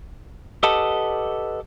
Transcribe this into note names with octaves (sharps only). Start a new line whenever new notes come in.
G4 A4 B4 D#5 F#5 A5